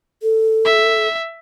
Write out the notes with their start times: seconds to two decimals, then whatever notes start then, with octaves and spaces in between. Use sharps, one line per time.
0.23 A4
0.65 E5